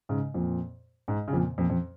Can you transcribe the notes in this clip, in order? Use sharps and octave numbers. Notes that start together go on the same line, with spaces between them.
G#2 C#3
F2 A#2
G#2
C#3
F2 A#2
F2 A#2
F2